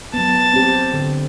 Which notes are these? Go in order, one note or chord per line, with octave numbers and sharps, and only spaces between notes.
F#3 B3 A5
C4 G4
D3